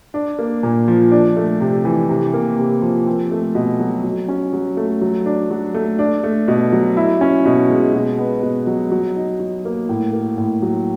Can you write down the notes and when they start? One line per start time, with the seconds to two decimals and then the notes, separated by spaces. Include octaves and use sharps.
0.14 D4
0.39 A#3
0.63 A#2
0.88 F3
1.12 D4
1.36 A3
1.60 C3
1.85 E3
2.09 C3
2.34 A#3
2.58 C3
2.82 F3
3.07 C4
3.31 A3
3.55 B2
3.80 F#3
4.04 F#3
4.28 C#4
4.53 F#3
4.77 A3
5.02 F#3
5.26 D4
5.51 F#3
5.74 A3
5.99 D4
6.24 A3
6.48 B2
6.72 F#3
6.97 E4
7.21 C#4
7.45 B2
7.70 G#3
7.94 B2
8.18 B3
8.42 B2
8.67 F#3
8.91 F#3
9.16 D#4
9.40 F#3
9.65 A#3
9.89 A2
10.13 A#3
10.38 A2
10.62 F#3